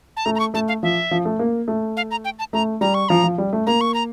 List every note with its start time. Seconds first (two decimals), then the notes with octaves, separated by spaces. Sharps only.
0.17 A5
0.25 A3 A#5
0.35 A#5
0.40 C#6
0.54 A3 A5
0.68 F5
0.83 F3 E5
1.11 F3
1.25 A3
1.39 A#3
1.68 A3
1.97 F5
2.11 A#5
2.25 G5
2.39 A5
2.53 A3 A#5
2.81 G3 A#5
2.94 C#6
3.09 F3 A#5
3.24 F3
3.38 G3
3.53 A3
3.67 A#3 A#5
3.81 C#6
3.94 A#5